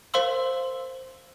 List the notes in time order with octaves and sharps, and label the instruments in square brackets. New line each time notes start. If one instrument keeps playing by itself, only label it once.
[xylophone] A#4 C5 F5 C6 E6